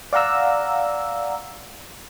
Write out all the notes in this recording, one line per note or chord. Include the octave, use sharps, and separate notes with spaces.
D5 F5 F#5 A#5 E6